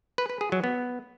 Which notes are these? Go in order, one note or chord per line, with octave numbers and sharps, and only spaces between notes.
B4
B4
G#4
F#3
B3